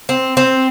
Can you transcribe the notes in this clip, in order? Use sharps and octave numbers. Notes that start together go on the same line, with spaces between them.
C4
C4